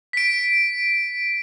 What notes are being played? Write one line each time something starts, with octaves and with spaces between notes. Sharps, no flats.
B6 D7